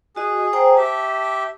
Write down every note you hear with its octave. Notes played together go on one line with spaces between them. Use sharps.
F#4 G#4 D#5
C5 G5 A#5
G4 E5 A5